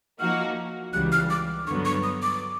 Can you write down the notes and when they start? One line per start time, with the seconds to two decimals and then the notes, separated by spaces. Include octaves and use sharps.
0.19 F3 A#3 D#4 F#4 F6
0.93 C#2 C#3 E3 G3 F#6
1.12 F6
1.30 D6
1.67 G2 D3 F#3 B3 C#6
1.85 C#6
2.03 D#6
2.22 D6